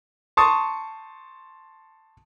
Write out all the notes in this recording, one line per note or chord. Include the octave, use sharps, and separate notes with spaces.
A5 C6 C#6 D#6 A6